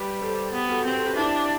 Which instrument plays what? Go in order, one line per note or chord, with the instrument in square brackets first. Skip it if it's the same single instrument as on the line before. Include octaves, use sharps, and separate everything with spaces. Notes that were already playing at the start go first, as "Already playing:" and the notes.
Already playing: [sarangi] G3 [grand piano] G4 B4
[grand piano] B4
A4 C5
[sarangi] B3 [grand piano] G4 B4
[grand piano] F#4 A4
[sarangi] C4 [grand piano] G4 B4
[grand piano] A4 C5
G4 B4
[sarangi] D4 [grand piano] E4 G4